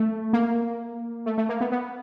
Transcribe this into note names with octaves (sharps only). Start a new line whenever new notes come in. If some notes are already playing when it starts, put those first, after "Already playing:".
Already playing: A3
A#3
A3
A3
A#3
B3
B3